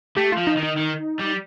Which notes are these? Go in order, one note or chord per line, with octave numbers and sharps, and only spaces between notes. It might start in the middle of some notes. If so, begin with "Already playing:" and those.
A3 G4
F4
F3
D#4
D#3
D#4
D#3
G3